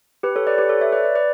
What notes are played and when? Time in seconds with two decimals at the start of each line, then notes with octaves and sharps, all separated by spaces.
0.23 G4 B4
0.36 A4 C#5
0.47 B4 D5
0.58 G4 B4
0.69 A4 C#5
0.81 C#5 E5
0.92 B4 D5
1.03 B4 D5
1.15 B4 D5